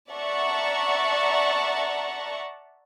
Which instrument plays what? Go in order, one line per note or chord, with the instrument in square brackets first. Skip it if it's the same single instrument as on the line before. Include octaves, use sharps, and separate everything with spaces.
[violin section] D5 E5 F#5 A5 A#5 C#6